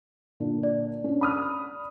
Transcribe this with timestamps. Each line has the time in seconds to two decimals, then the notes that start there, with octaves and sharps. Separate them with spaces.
0.40 A#2 D3 D4
0.63 D5
1.04 C#4 D4
1.21 B5 D#6 F6